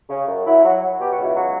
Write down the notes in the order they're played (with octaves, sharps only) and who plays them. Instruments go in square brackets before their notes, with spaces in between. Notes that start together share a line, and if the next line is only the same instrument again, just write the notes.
[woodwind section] C#3
F#2
F#3 E4
F#3
F#3
B2 G4
F#4
C#2
E4
F#3 F#4